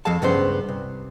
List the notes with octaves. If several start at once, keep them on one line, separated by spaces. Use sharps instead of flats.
F2 F3 A4 F5 A5
C#2 G2 B3 C#4 C5
C2